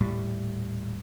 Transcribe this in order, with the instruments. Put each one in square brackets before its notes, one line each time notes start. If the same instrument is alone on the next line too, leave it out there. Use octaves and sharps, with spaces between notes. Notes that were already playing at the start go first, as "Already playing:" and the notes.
[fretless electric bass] D#1 A2 G3